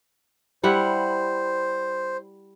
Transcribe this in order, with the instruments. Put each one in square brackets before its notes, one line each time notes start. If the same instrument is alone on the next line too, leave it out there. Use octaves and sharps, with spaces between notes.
[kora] G3 E4 F#5 [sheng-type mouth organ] C5